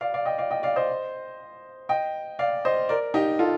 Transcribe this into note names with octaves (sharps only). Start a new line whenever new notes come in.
D5 F5
D5 F5
D#5 G5
D5 F5
D#5 G5
D5 F5
C5 D#5
D#5 G5
D5 F5
C5 D#5
A#4 D5
D#4 G4
F4 A4